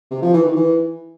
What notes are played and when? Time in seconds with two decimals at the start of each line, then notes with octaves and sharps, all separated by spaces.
0.11 C3
0.22 F3
0.33 E3
0.45 D#3
0.56 E3